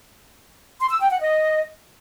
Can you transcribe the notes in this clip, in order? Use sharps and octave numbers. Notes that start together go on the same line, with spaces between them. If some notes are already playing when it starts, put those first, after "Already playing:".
C6
E6
G5
F#5
D#5